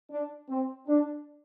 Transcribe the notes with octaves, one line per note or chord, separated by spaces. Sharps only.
D4
C4
D4